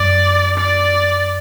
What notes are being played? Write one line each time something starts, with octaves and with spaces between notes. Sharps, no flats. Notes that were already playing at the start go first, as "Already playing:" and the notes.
Already playing: F#2 D5
D5